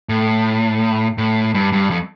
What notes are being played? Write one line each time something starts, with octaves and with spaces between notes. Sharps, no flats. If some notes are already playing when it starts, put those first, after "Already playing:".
A2
A2
G2
G2
F2